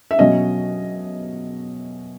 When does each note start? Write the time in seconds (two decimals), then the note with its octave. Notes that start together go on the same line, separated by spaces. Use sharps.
0.11 E5
0.19 B2 F#3 C#4 D#5